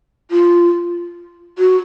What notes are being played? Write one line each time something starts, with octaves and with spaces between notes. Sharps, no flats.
F4
F#4